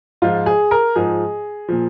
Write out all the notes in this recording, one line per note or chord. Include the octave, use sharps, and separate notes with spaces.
G#2 F3 F4
G#4
A#4
G#2 F3 G#4
A#2 F3